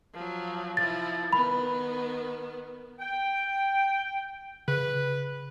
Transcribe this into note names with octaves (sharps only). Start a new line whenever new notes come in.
F3 F#3
F3 E4 A6
D#3 B3 B5
G5
C#3 B4